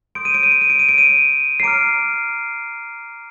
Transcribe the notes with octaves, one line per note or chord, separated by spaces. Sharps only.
C6 D#6 G6 D7
D#7
D7
D#7
D7
D#7
D7
D#7
D7
D#7
D7
C7
A#5 D6 F6 D7